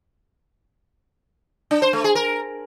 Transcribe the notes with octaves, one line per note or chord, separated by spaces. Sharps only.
D4
C5
A3
G#4
A#4